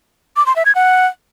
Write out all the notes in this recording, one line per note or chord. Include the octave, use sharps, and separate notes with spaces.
D6
C6
E5
G#6
F#5